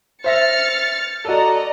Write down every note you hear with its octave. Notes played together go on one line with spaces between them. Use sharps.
C5 E5 F6 A6 A#6 C#7
F#4 A4 D5 D#5 A#5